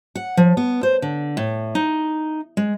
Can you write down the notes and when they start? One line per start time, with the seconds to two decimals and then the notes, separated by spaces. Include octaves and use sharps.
0.15 F#5
0.37 F3
0.57 B3
0.83 C5
1.02 D3
1.37 A2
1.75 D#4
2.57 G#3